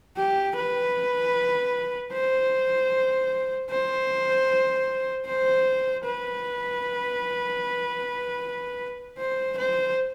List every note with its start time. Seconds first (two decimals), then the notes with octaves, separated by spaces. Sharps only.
0.17 G4
0.56 B4
2.13 C5
3.70 C5
5.26 C5
6.05 B4
9.18 C5
9.58 C5